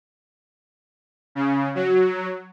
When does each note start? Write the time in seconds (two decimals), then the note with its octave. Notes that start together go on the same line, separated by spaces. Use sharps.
1.35 C#3
1.75 F#3